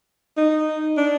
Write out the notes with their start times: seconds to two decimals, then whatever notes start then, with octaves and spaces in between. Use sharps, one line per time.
0.37 D#4
0.97 D4